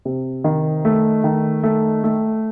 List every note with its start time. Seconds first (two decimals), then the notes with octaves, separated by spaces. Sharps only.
0.05 C3
0.44 D#3
0.85 A3
1.24 D#3
1.63 A3
2.04 A3